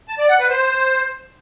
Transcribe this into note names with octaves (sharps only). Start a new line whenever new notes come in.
A5
D5
F#5
B4
C5